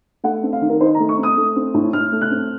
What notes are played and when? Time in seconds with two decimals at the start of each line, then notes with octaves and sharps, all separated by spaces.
0.24 A3 F#5
0.43 C4
0.53 F5
0.61 D#3
0.69 A#4
0.80 D#4 C5
0.95 A#5
1.00 A3
1.09 C#6
1.18 C4
1.23 D#6
1.37 A3
1.56 C4
1.74 A2
1.93 A2 F6
2.12 A3
2.21 F#6
2.31 C4